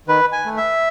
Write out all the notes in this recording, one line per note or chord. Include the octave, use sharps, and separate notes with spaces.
D#3 B4
G#5
A3
E5